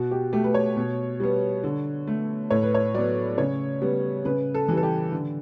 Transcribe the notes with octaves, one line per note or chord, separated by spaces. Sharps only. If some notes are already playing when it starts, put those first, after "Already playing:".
Already playing: B2 F#4
G4
A3 G4
B4
C#5
B2
G3 B3
D3
A3
A2 C#5
B4
C#5
F#3 B3 D5
C#3 C#5
G3 B3
C#3 B4
A4
E3 G3
A4
G4
D3